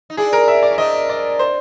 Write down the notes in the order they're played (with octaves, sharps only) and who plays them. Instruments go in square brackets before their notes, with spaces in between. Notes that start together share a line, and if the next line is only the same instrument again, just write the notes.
[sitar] D#4
[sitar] D4 E4 [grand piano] G#4
[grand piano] A#4
E5
D5
[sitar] C#4
[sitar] C4 D4 [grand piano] D#5
[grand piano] D5
C5